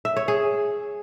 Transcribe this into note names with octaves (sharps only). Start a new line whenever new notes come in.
E5
C#5
G#4